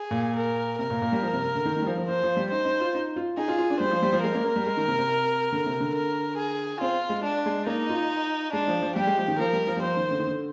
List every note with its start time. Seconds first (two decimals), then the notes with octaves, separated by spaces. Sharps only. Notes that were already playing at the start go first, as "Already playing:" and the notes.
Already playing: G#4
0.11 A#2
0.36 A#4
0.79 C3 A#4
0.90 A#2
1.02 A#2
1.12 G3
1.22 F3
1.33 C3
1.44 C3
1.55 D3
1.65 D#3
1.76 D#3
1.82 G3
1.87 F3
1.97 F3
2.08 F3 C5
2.23 F3
2.37 G3
2.51 D#4 C5
2.65 D#4
2.80 F4
2.95 D#4
3.16 F4
3.37 D#4 G#4
3.48 F4
3.58 F4
3.70 D4
3.80 G3 C5
3.91 F3
4.02 G3
4.13 F3
4.23 G#3 A#4
4.35 A#3
4.45 A#3
4.56 G3
4.66 G#3
4.77 D#3
4.88 C3
4.98 C3
5.52 D3
5.66 C3
5.80 D3
5.95 A#4
6.38 G#4
6.81 C4 F4
7.10 G#3
7.24 D4
7.46 G#3
7.67 A#3 D#4
7.89 F4
8.53 G#3 D4
8.68 F3
8.82 F3
8.96 G3 G4
9.07 G#3
9.17 F3
9.28 D#3
9.39 F3 A#4
9.53 G3
9.67 F3
9.77 G3
9.82 F3 C5
9.97 D#3
10.11 D3
10.19 D#3
10.27 D3